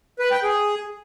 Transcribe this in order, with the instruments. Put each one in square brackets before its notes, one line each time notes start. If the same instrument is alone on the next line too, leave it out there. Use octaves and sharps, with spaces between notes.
[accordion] B4
G5
G#4